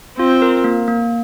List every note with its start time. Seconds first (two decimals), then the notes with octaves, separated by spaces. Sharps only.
0.18 C4 F4
0.42 A#4
0.64 A#3
0.88 A#3